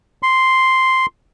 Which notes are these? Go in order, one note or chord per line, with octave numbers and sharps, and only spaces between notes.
C6